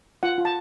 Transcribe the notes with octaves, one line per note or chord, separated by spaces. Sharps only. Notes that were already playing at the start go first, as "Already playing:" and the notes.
F4 F#5
F4
A5